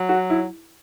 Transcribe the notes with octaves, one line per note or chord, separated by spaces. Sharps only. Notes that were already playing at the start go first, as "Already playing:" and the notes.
Already playing: F#3
F#4
E4